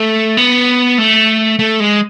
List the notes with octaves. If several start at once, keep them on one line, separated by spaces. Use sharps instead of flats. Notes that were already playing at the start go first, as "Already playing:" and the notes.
Already playing: A3
B3
A3
A3
G#3